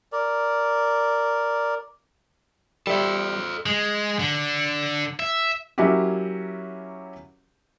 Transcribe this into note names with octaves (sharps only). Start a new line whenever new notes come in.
A#4 D5
G3 A4 C5 E5
G#3
D3
E5
F#3 A#3 C#4 E4 F#4 G4